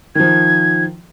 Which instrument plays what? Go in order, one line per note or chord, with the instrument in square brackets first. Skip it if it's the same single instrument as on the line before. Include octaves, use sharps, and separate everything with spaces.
[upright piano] D#3 F3 [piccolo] G#6